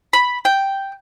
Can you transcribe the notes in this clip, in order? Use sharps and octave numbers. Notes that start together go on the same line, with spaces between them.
B5
G5